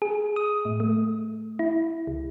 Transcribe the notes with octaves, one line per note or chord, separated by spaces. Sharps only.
G#4
D#6
A2
A3
E4
C#2